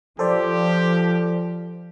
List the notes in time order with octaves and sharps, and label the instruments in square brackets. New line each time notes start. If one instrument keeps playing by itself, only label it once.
[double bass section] F3 [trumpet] G4 [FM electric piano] A4 C5 D5